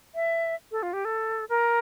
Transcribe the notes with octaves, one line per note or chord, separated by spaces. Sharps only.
E5
A4
F4
G4
A4
A#4